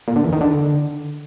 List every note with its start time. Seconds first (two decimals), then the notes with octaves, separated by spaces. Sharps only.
0.08 A#2
0.16 D3
0.24 E2
0.33 D#3
0.41 D3